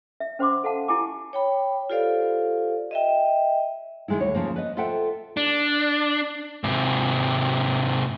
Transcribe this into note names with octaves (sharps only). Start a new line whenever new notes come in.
E5
C#4 C5 F#5 C6 D6
A4 F5 F#5 A5
E4 G4 G#5 A5 D6
C#5 G5 B5
F4 G4 A4 C5 D5 F5
D#5 E5 G5
D#3 E3 G#3 D#4 E4
D2 G3 C#5
D#2 C#3 F3 A#3
B4 D#5
F4 A4 C5 E5 F#5 G5
D4
G#2 C3